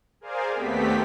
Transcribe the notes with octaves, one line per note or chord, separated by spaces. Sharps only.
G#4 A#4 C5 D5 F5 G#5
D#2 A3 B3 C4 G4 B6